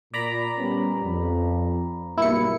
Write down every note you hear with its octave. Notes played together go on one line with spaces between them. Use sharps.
A#2 D5 A#5 B5
G3 B3 C#4
F2
B1 G2 A#3 E4 C#7